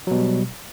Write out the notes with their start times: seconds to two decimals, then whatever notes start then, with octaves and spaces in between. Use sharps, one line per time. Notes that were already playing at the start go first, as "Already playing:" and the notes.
0.07 F#3
0.11 B2
0.15 G3